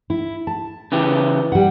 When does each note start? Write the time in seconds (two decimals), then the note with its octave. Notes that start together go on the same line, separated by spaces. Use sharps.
0.10 E4
0.47 A5
0.92 C#3 E3 G4
1.52 G3 F#5